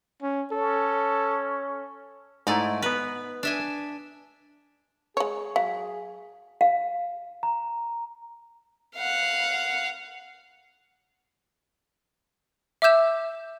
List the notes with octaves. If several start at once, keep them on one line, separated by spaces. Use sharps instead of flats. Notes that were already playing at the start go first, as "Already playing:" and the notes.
C#4
C#4 A4
G#2 A3 D#4 E4 D5
B3 B4 A#5
D4 E5 G#5
G#3 G#4 C#5
F#3 F5
F5
A#5
F5 F#5
E5 D6 E6 G6 E7